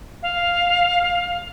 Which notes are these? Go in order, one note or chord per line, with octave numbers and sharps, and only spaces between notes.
F5